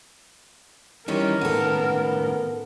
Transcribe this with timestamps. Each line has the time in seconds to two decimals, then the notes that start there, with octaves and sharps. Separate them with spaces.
1.08 D#3 E3 G3 C#4 A#4
1.41 A2 D#3 A#3 B3 C#4 A4